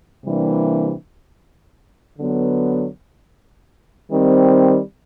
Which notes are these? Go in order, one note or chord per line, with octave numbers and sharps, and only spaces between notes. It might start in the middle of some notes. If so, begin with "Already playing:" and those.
C3 E3 G3 A#3 D4
D3 F#3 B3
D#3 G3 C4